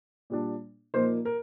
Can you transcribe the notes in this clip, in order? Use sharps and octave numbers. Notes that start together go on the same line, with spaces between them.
A#2 G3 D4
A#2 F3 A#3 D#4 C5
A#4